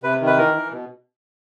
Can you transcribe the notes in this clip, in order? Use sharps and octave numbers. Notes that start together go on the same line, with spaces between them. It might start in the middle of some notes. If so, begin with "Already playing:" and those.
C3 B4
D#3
B4
E3 A#4
E3
B2